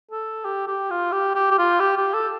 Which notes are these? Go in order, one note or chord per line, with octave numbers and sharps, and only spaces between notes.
A4
G4
G4
F4
G4
G4
G4
F4
G4
G4
A4